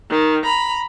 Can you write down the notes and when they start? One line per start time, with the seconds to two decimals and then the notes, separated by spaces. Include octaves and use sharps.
0.10 D#3
0.44 A#5 B5